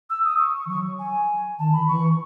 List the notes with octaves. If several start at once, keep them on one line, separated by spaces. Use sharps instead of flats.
E6
D#6
C#6
C#6
E3
F#3 C#6
G#5
D#3 A5
B5
E3 C#6